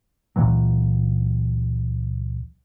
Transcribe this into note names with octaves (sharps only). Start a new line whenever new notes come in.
C#2 A#2 E3 F#3